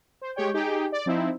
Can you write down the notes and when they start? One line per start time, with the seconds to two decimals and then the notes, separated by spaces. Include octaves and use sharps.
0.21 C5
0.36 G#3 G4 C#5 G5
0.54 D#4 G4 G#4 G5
0.92 D5
1.06 F3 C4 D#4 E4